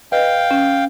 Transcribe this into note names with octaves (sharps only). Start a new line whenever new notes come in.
B4 D#5 F5 G5
C#4